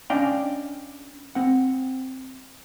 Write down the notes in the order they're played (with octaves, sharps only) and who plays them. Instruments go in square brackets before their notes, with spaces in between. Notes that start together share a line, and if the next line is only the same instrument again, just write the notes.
[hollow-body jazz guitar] C#4 D4 D#5 F5 G5
C4 F#5